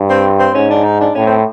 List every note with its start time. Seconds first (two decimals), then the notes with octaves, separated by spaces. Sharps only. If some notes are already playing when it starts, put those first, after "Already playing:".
Already playing: G2
0.10 C4
0.40 C4
0.55 G#2 C#4
0.70 D4
0.85 D#4
1.01 D4
1.15 A2 C#4
1.26 C4